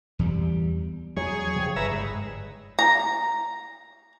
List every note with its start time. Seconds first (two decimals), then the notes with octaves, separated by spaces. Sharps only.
0.19 E2 G3
1.17 E2 F#3 G#4 C#5
1.56 C#3 F3 G3
1.76 G1 B4 E5 A#5
1.92 G#2
2.79 A#5